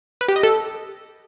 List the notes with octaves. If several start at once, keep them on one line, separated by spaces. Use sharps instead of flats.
B4
G4
D#5
A4